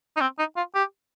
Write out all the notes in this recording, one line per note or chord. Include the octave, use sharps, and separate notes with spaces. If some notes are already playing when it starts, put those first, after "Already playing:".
D#4
C4
D#4
F4
G4